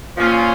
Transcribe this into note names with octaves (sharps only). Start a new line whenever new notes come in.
A#2 F3 A#3 C#4 F4